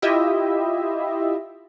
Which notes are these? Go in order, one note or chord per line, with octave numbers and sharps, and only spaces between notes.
E4 F4 G4 D#5 E5